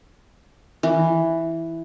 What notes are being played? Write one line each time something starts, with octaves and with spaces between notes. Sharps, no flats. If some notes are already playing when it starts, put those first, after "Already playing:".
E3